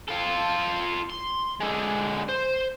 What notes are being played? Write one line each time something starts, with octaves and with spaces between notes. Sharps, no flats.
F4 A4
C6
D3 G#3
C5